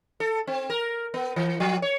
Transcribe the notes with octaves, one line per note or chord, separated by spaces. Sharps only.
A4
C4
A#4
B3
E3
F3
C#5